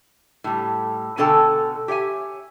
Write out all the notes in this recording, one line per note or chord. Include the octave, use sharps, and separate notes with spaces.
A2 G3
B2 D3 C#4 A4 G5 A5
G4 C#5 E5 G#5